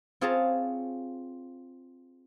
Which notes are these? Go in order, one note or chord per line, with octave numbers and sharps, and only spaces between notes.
C4 F4 G#4 C#5 A5 A#5